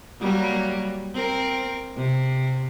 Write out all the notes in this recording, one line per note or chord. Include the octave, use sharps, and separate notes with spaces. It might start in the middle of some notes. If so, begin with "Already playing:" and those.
F#3 G3 A#3
C4 A#4
C3